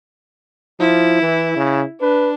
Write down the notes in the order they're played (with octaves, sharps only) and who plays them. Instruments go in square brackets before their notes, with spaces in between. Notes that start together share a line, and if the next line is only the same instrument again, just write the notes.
[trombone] F3 [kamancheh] E4
[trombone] E3
C#3
[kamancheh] D4 [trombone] B4